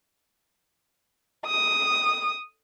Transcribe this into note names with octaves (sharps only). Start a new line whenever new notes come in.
D#6